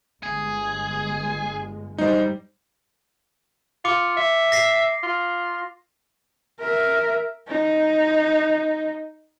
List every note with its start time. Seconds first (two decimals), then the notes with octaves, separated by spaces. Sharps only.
0.23 G1 G#3 G#4
1.98 G3 D#4 C5
3.85 F4 D6 C#7
4.17 E5
4.52 A#6 C7
5.03 F4
6.60 A#4 E5
7.48 D#4